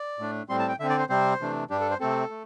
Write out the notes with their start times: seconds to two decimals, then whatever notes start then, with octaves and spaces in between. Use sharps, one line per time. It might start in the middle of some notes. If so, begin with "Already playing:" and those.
Already playing: D5
0.19 A2 A3 D4
0.49 A2 G3 C4 C6
0.59 A5
0.69 G5
0.80 D3 C4 E5
0.89 D5
0.99 C5
1.09 C3 G3 C4 C5
1.40 C3 E3 A3 D4
1.70 G2 G3 D4 G4
1.80 A4
1.90 C5
2.00 C3 A3 C4 A4
2.30 A3